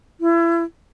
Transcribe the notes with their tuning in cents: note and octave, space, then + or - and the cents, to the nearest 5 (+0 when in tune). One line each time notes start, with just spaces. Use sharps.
E4 +35